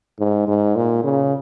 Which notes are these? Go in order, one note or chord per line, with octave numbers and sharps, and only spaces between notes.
G#2
G#2
A#2
C#3